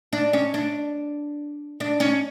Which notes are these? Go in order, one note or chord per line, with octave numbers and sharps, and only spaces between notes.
D4
C#4
D4
D4
C#4